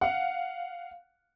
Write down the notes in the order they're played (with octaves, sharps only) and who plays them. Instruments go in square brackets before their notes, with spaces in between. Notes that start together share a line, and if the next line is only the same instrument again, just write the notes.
[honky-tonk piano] F5 F#5